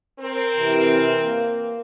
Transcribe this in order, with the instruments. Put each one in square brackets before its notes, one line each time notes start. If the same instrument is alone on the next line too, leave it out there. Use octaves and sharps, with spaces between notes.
[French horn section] C4 A#4
[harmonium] C3 E3
A#3